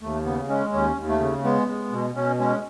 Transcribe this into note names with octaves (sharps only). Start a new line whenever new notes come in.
D#2 A3
C#3 B3
G#3 C#4
D#2 C#4
D#2
A3
C#3
G#3 B3
G#3
B2
B2 C#4
G#3 C#4